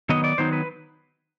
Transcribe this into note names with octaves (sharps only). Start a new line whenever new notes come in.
D#3 F#3 B3 D#4 D#5
D5
D#3 F#3 B3 D#4 C5
B4